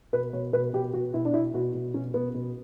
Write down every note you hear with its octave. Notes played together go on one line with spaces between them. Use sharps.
B2 B4
B2 C#5
B2 B4
B2 G4
B2 F#4
B2 E4
D4
B2 E4
B2 F#4
B2
B2 C#4
B2 B3
B2